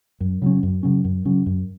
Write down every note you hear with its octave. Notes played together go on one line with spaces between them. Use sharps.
F#2
C#3 F#3 C#4
F#2
C#3 F#3 C#4
F#2
C#3 F#3 C#4
F#2